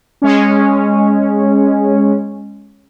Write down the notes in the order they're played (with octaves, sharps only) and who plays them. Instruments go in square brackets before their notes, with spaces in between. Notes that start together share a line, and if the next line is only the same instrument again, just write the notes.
[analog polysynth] G#3 C#4